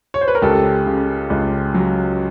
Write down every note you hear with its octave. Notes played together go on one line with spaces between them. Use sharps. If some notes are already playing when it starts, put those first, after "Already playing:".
C#5
C5
B4
A#4
C#2 G4 A4
C#3
C#2
F#3